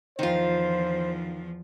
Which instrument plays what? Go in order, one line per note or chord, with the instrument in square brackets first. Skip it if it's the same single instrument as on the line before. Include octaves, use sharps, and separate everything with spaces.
[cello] E2 F3 [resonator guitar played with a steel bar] D#3 F4 [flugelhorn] C5